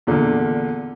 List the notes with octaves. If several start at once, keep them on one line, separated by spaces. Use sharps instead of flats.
E2 A#2 D3